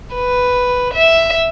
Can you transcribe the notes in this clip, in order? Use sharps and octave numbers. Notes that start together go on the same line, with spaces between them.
B4
E5